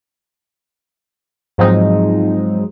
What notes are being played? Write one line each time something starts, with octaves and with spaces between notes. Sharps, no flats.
G#2 F3 F#3 G#3 C4 D#4